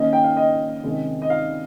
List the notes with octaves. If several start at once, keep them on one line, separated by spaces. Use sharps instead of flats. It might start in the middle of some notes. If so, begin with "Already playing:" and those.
Already playing: D#3 A#3 C#4 D#5
G5
F5
D#5
C3 D#3 G#3 C#4
D#5
F5